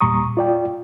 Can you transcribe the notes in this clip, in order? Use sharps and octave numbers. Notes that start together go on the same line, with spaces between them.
E2 A#2 G3 A#5 C#6 D#6
F4 D5 G5